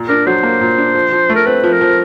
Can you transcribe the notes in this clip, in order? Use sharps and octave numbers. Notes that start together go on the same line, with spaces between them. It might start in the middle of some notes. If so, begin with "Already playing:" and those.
Already playing: A#2
D4 A#4
F#3 C5
A#3
A#2
D4
F3
F3
A3
A#4
C4 B4
F3
A#4
F3